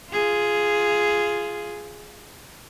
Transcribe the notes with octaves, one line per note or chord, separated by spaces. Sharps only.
F4 G#4